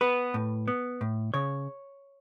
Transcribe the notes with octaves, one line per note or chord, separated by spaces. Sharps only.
B3 B4
A2
B3
A2
C#3 C#5